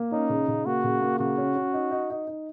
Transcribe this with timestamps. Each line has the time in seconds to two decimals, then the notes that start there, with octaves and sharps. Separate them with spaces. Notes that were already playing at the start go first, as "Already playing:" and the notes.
Already playing: A#3
0.12 C#4 D#4
0.30 C#3
0.48 C#3
0.66 A#3 F#4
0.84 C#3
1.02 A#3
1.19 C#3 F#4
1.38 C#4
1.55 C#4
1.74 D#4
1.91 D#4
2.10 D#4
2.27 D#4